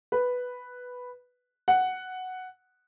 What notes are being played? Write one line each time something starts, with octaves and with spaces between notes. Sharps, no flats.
B4
F#5